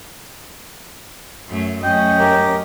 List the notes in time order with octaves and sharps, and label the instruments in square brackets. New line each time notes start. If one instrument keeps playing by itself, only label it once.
[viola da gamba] F#2 A3
[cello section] F#2 A3 C#4 [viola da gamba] D#5 [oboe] G5
[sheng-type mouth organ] G4 A#4